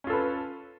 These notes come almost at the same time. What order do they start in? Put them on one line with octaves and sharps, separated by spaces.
C#4 F4 A4 B4